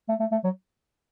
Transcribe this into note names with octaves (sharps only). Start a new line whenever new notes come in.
A3
A3
A3
F#3